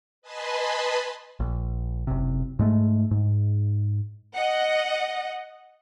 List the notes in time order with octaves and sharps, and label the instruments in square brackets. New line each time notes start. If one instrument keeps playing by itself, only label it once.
[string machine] B4 D#5 G#5 A5 B5 C6
[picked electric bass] A#1
F#1 C3
G#2 G#3 A3
G#2
[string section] D#5 F#5